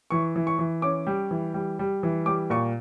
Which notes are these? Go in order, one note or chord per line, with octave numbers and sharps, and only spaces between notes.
E3 C#6
E3
C#6
E3
C#4 D6
G3
E3
G3
G3
E3
G3 D6
A#2 C#6